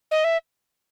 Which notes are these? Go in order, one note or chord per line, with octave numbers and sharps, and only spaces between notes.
D#5
E5